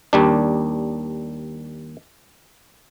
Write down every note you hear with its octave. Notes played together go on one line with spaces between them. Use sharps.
D#2 G3 D4